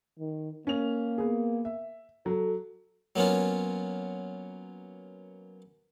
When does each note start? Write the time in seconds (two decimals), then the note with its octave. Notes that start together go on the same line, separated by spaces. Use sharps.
0.19 D#3
0.67 A#3 C#4 F7
1.18 B3 G#4
1.65 E5
2.26 F#3 A4
3.16 F#3 A#3 B3 C#4 F4